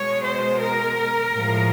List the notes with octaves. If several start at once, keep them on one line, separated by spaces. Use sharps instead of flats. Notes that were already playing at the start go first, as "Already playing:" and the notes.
Already playing: B2 G#3 C#5
C5
A#4
A2 F3 G#3